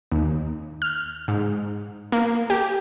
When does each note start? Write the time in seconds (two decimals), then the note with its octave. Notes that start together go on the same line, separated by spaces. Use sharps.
0.12 D#2
0.82 F6
1.28 G#2
2.12 A#3
2.50 G4